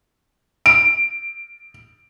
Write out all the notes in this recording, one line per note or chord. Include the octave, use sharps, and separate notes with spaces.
D7